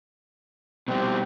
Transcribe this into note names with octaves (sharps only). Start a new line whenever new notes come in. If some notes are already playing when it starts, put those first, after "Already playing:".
B2 G3 C4